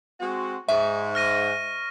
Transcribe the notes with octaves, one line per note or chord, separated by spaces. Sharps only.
G#3 C4 F#4
G#2 E5 C#6
F6 A#6 D#7